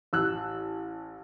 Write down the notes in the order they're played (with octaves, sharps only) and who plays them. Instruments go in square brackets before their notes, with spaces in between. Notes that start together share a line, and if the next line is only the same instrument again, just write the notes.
[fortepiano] A1 E6 F#6